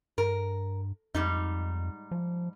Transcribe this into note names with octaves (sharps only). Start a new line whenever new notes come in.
G2 A#4
F2 G#2 G3 D#4
F3